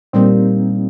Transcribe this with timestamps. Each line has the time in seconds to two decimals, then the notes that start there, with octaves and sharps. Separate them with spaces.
0.13 A#2 G3 A#3 C4 D#4